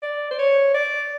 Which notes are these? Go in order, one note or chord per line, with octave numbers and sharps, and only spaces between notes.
D5
C5
C#5
D5